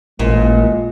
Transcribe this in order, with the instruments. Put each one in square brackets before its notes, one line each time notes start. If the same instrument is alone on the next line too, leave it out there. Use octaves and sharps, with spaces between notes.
[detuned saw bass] A1 [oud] A#2 [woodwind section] G#3